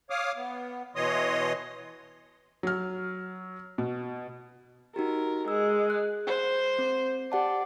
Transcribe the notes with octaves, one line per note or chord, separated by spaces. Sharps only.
C#5 F5 D6 D#6 F6
B3
B2 E3 C#5 D#5 C6 D#6
F#3 F6
B2
D#4 F#4 G4 A#4
G#3 E6
F#6
C5
C4
G4 D5 F#5 A5